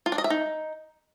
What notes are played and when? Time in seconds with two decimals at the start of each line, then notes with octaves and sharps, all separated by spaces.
0.06 F4
0.12 D4
0.18 D#5
0.24 E5
0.30 D#4